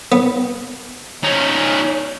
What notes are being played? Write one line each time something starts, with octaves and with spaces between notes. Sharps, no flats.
B3
C#4 D#4